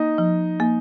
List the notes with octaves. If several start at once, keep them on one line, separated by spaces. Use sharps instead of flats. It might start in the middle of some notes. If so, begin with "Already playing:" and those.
Already playing: A#3 D#4 D#5
F3
A#3